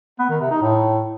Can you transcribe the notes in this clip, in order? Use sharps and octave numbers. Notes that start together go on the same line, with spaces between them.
B3
D#3
C3
D#4
A2